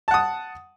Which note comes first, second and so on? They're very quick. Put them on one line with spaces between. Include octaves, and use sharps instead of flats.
A5 F#5 D#6